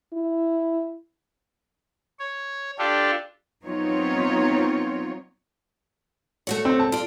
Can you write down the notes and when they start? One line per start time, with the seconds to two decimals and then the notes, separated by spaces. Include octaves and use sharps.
0.13 E4
2.19 C#5
2.78 D4 F4 G4 A4
3.63 F#3 B3 C4 D#4 F4 C#5
6.47 A3 F#4 C#5
6.65 C4
6.80 A5
6.92 F4 D5